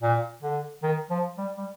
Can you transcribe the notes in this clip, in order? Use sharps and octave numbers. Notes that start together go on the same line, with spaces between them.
A#2
D3
D#3
F3
G3
G3